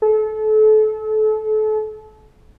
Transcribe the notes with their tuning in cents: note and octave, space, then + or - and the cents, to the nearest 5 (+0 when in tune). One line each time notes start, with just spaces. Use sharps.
A4 -30